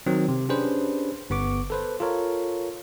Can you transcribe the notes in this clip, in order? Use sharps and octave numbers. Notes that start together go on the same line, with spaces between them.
D#3 F#3 C4
C3
C#4 D4 G4 G#4 B4 C5
G1 B3 C#6 D6
A4 B4 C5
F4 A4 A#4 C#5